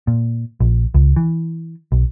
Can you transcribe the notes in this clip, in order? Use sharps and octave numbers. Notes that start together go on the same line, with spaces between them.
A#2
A#1
C#2
E3
B1